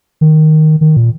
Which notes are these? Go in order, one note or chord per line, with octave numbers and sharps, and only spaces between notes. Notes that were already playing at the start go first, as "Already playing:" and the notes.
D#3
D#3
A#2